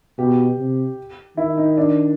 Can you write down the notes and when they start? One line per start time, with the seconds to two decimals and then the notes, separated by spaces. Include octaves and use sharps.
0.18 B2 G4
0.58 C3
1.37 D#3 E4
1.57 D#4
1.77 D4